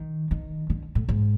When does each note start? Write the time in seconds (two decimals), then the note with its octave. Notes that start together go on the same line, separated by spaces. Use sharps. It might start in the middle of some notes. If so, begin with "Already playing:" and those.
Already playing: D#3
0.31 D#3
0.70 D3
0.95 A2
1.09 G#2